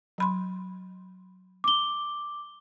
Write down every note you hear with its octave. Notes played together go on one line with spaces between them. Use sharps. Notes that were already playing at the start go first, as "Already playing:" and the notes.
F#3 B5 C6
D6 G7